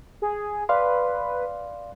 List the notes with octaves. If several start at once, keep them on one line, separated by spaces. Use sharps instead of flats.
G#4
B4 D5 F5 C6